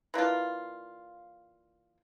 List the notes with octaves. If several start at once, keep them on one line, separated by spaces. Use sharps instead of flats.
E3 A#3 D4 F4